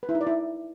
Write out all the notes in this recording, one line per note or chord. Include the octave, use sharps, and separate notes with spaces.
B4
E4
D#4
D5
E4